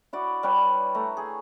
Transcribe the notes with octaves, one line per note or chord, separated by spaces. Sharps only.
E4 F#4 D5
G3 B4 C#5
A3 A#5
G#4